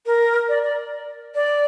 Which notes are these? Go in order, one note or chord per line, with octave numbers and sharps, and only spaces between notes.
A#4
D5
D5
D5